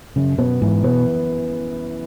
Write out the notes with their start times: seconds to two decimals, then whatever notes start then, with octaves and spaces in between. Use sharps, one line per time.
0.16 F#2 C#3
0.38 B2 B3
0.62 G#2 E3
0.83 B2 B3